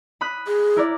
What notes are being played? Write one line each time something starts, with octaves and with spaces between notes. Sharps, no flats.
B5 D#6 F#6
G#4
E4 A#4 D5